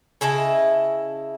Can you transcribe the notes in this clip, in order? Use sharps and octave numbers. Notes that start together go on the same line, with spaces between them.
C#3 E4 D#5 A5